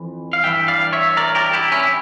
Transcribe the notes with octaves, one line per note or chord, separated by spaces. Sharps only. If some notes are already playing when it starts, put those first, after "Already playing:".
Already playing: F2 E3
F5
G2 E3 G3 E5 G5
D5 F5
C#5 E5
A#4 D5
G4 A#4
E4 G4
C#4 E4